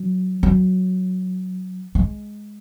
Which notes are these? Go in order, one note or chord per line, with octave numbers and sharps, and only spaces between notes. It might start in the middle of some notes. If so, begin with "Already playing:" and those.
Already playing: F#3
F#3
G#3